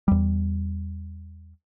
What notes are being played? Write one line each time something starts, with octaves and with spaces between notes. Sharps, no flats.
E2 G3